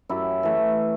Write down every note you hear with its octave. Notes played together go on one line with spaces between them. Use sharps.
F#2 E4 G4
E3 A3